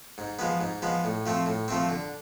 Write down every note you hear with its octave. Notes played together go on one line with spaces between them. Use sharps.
G#2
F3 G#3 B3
G#2
F3 G#3 B3
A2
F3 A3 C4
A2
F3 A3 C4
D3